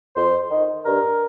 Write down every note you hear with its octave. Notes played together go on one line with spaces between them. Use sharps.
F2 C5
D#3
G2 A#4